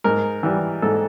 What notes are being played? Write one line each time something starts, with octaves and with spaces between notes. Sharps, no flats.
G#2 A#4
E3 G3
G#2 A4